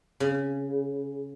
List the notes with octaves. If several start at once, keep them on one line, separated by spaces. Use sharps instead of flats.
C#3